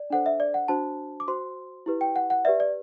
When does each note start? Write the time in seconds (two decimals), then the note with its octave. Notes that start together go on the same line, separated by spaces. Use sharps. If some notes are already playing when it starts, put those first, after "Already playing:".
Already playing: D5
0.10 D4 A4 C5 F#5
0.26 E5
0.40 D5
0.54 F#5
0.68 D4 F#4 C5 A5
1.20 D6
1.28 F#4 C5 C6
1.86 E4 G4 B4
2.01 G5
2.16 F#5
2.30 F#5
2.45 G4 B4 D5 E5
2.60 D5